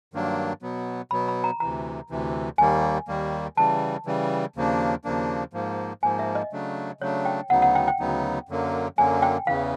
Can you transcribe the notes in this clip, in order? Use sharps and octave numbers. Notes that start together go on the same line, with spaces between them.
G2 D#3 F#3 A#3 D4
B2 F#3 B3
B2 F#3 B3 B5
B5
A#5
D2 C3 E3 A#5
D2 C3 E3
D#2 D#3 G3 A#3 G#5
D#2 D#3 G3 A#3
C#3 E3 G3 A5
C#3 E3 G3
D#2 C#3 F3 A#3 D4
D#2 C#3 F3 A#3 D4
G#2 F3 A#3
G#2 F3 A#3 G#5
E5
D#5
C#3 F#3 A3 D4
C#3 F#3 A3 D4 C#5
G5
D2 C#3 F#3 B3 D#4 F#5
F#5
G5
G5
D2 C#3 F#3 B3 D#4
F#2 D3 F#3 A#3
F#2 D3 F#3 A#3 G#5
G5
E2 C#3 E3 F5